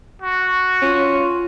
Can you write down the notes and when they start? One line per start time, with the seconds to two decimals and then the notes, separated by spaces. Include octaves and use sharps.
0.22 F#4 C#6
0.82 C#4 F4